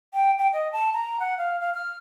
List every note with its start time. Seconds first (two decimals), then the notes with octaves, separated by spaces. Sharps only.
0.14 G5
0.39 G5
0.53 D#5
0.73 A5
0.94 A#5
1.20 F#5
1.38 F5
1.61 F5
1.74 F6